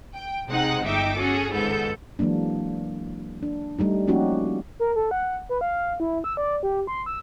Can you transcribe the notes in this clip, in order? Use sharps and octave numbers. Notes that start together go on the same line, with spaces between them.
G5
C3 G#3 C4 D#4 F#5 F#6
G1 D#4 E5 G5 D6
C#4 F#4 G#4 A4
G#1 C#2 G#2 B3 A4 G6
E3 F#3 G#3 A#3 D4
D4
G3 A3 D#4
F3 A#3 C#4 D#4 F#4 G4
A#4
A4
F#5
B4
F5
E4
E6
D5
G4
C6
E6